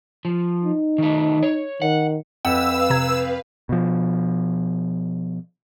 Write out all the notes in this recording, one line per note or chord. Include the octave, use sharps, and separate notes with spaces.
F3
D#4
D#3 A3
C#5
D#3 F#5
F2 B4 F5 F#5 E6
C3 A#5 G#6
B2 F3